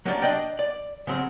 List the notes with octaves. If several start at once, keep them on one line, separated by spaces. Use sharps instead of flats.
F#3 A#3 C#4 D4 G4 D5
D4 D5 D#5 G5 A#5
D5
C#3 F#3 C4